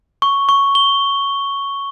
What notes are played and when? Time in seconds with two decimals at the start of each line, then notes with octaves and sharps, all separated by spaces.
0.22 C#6
0.49 C#6
0.75 G7